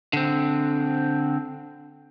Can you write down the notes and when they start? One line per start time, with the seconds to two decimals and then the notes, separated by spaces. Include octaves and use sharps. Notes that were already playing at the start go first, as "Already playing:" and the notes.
0.13 D3 C4